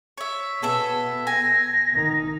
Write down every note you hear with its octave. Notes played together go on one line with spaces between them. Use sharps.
C#5 E5
B2 B3 G#4 A4 E5
G#5 A#6
D#3 D#4